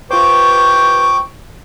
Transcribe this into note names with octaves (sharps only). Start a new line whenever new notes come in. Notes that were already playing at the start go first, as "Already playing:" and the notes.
F4 G4 B4 C5 G5 C#6 D6 G6